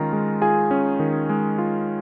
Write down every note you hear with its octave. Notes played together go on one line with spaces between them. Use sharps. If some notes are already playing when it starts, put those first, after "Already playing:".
Already playing: D#3 G#3 C#4 D#4 F4 A#4 A#5
G#3
F4 G#4 G#5
C#4
D#3
G#3
F4